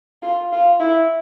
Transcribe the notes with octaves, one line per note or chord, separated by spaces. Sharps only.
F4
F4
E4